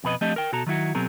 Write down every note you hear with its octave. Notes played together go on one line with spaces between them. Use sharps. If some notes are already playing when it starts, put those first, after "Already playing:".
F2 B2 B4 D#5
F3 A3 C4 D4 G4 D#5
A#4 G5
B2 F#4 A4 A#5
D#3 F#3 E4 F#4
B2 F#3 C4 G#4 A#4